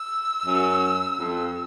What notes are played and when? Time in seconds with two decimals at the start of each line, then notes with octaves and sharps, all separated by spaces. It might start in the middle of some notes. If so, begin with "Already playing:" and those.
Already playing: E6
0.46 F#2
1.18 F2